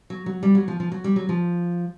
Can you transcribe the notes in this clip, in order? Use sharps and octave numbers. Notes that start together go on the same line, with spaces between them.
F#3
F#3
G3
F#3
F3
F3
F#3
G3
F#3
F3